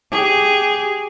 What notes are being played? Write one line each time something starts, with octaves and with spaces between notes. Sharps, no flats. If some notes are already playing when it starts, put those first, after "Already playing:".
G4 G#4